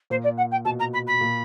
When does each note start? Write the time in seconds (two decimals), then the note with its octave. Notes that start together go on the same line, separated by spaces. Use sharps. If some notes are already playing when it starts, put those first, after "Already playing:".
0.10 A#2 C5
0.23 D5
0.37 F#5
0.51 G5
0.65 B2 A5
0.79 A#5
0.93 B5
1.07 B5
1.21 A#2